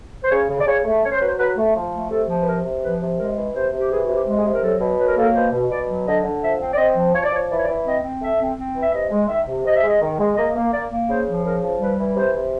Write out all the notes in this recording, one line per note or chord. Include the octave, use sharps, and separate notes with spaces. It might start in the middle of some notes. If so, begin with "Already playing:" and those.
C5
C#3 C#5
C#3
D5
C#3 C#5
A3
C#4 C#5
C5
F#3 B4
C5
F#3 B4
A3
F3
A3
C3 A4
F3
B4
C3 A#4
C3
F3 B4
C3
G#3 A#4
E3
C3 C5
C3
G4
E3 G#4
F#4
C3
G4
G#3
G#4
C3
A#4
F#3 A4
B2
F#3 B4
A#4
A#3 A4
A#4
B2 C5
B2
B2 D5
F#3
D3 D#5
D3
F3 E5
C4
D5
C4 D#5
F3
F3 C#5
D5
F3 C#5
E3 D5
C#5
D5
E3
C4 D#5
C4
A3 E5
C4
C4
E3
E5
C3 D#5
G#3
D#3 E5
C3
C3 D#5
E5
G#3
D#5
D#3
G#3
A#3 D#5
A#3
A#3 D5
A#3
C#3 C5
F3
C#3 A#4
F3
G3 B4
E3
C3 C5
C3